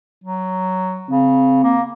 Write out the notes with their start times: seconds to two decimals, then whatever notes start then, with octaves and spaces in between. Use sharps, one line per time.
0.24 F#3
1.10 C#3 C4
1.64 A#3